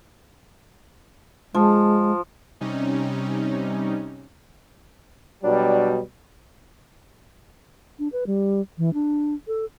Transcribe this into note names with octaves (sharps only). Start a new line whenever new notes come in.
F3 G#3
C3 G3 C#4 D#4
B2 F#3 G3 D4
D4
B4
G3
E3
D4
A4